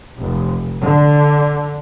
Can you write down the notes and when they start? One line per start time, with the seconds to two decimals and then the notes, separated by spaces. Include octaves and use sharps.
0.18 F1
0.81 D3